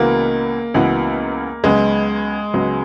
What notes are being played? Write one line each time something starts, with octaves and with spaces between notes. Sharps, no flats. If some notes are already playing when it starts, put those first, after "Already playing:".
Already playing: C#2 C#3 E3 A#3 B3 F#4
C#2 C#3 E3 B3 F#4
C#2 C#3 F#3 G#3 B3 F#4
C#2 C#3 F#3 B3 F#4